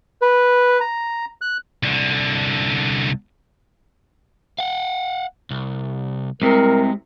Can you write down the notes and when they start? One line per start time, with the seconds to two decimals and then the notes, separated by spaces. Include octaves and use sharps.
0.22 B4
0.80 A#5
1.41 F#6
1.83 C2 D3
4.58 F5 F#5
5.51 C2
6.42 C2 C3 G#3 A#4